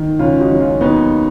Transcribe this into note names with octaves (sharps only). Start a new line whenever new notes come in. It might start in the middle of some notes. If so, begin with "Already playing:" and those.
Already playing: D#3
C#2 C#4 F4
D#4 F#4
F#3
C#4 F4
D#2 B3 D#4